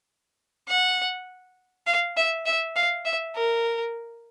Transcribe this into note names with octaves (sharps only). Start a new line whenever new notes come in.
F#5
F5
E5
E5
F5
E5
A#4